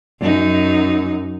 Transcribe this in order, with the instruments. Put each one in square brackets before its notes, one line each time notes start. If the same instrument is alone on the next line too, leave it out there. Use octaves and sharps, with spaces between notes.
[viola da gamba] F#2 D#4